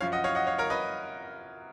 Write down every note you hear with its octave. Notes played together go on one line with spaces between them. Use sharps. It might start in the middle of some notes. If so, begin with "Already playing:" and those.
F#2 F3 C#5 F5
D#5 F#5
C#5 F5
D#5 F#5
C#5 F5
A#4 C#5
B4 D#5